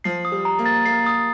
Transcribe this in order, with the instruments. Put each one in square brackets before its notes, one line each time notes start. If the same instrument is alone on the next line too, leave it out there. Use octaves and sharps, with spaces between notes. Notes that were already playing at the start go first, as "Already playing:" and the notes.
[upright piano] F3 [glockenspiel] C7
[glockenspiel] D#6
[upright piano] G3
[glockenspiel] A#5
[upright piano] A#3
[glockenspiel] A6
[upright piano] A#3 [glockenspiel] C7
[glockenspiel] D#6